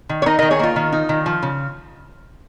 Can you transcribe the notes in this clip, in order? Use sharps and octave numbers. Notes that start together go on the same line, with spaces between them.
D#3
C#5
D#4 A#4 D#5
D#3 A#4 D#5
G#4 C#5
A#3 F4
D#3
D#4
D#3
F3
C#3